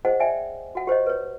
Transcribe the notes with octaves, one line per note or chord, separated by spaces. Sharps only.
G#4 C5 D#5 F#5
D5 E5 G5 G#5
F#4 F#5
G4 C5 C#5 D#5
B4 C#5